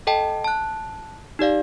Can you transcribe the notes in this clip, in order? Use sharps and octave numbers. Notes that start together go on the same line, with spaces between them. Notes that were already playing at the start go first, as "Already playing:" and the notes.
A4 D#5 G5 A5
A5 F#6
D#4 G4 D5 F5